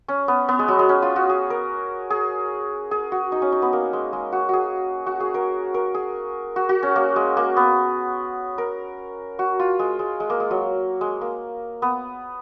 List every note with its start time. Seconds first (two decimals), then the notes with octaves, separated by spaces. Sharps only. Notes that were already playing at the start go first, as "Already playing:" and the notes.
0.08 C#4
0.28 B3
0.48 B3
0.59 G#3
0.68 F#3
0.79 G#3
0.89 C#4
1.02 F4
1.16 F#4
1.30 G#4
1.50 A#4
2.10 G#4
2.91 G#4
3.12 F#4
3.32 D#4
3.42 C#4
3.52 D#4
3.62 B3
3.73 A#3
3.93 G#3
4.13 G#3
4.32 F#4
4.49 F#4 G#4
5.06 F#4
5.20 G#4
5.34 A#4
5.74 A#4
5.94 G#4
6.56 F#4
6.69 F#4
6.83 C#4
6.96 A#3
7.16 G#3
7.37 A#3
7.57 B3
8.58 A#4
9.39 F#4
9.59 F4
9.79 G#3
9.99 G#3
10.20 G#3
10.30 A#3
10.40 G#3
10.51 F#3
11.01 G#3
11.21 A#3
11.82 B3